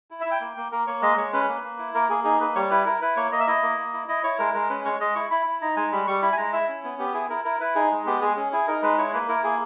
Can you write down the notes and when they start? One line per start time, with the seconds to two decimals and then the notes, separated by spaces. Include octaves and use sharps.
0.11 E4
0.21 E5
0.26 E4
0.31 G5
0.41 A#3
0.57 A#3
0.72 A#3 A#4
0.87 A#3 C#5
1.02 G#3 D#5
1.17 G#3 C#5
1.33 C#4 B4
1.48 A#3
1.64 A#3
1.79 E4
1.95 A#3 A#4
2.10 A#3 G#4
2.24 D#4 G#4
2.40 A#3 B4
2.55 G3 C#5
2.71 E4 B4
2.86 E4 A#4
3.01 E4 B4
3.17 A#3 C#5
3.31 A#3 D#5
3.40 E5
3.47 E4 D#5
3.63 A#3
3.77 A#3
3.93 E4
4.08 E4 D#5
4.23 E4 C#5
4.39 G#3 A#4
4.54 G#3 A#4
4.70 C#4 B4
4.85 G#3 C#5
5.00 G#3 D#5
5.15 E4 C#6
5.31 E4 B5
5.46 E4
5.62 D#4 A#5
5.77 G#3 G#5
5.92 G3 B5
6.07 G3 C#6
6.22 E4 B5
6.33 G#5
6.37 G#3 A#5
6.53 E4 E5
6.69 C#4
6.84 B3
6.99 B3 G4
7.14 E4 G#4
7.30 E4 A#4
7.45 E4 A#4
7.60 E4 B4
7.75 D#4 G#4
7.91 G#3
8.06 B3 G4
8.22 G#3 G#4
8.36 C#4 G#4
8.52 E4 G#4
8.67 D#4 A#4
8.82 G#3 B4
8.98 E4 C#5
9.14 A#3 B4
9.28 E4 A#4
9.44 A#3 G#4